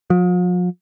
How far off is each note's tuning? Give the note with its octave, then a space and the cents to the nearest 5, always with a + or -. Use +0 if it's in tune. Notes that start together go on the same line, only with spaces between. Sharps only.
F3 +45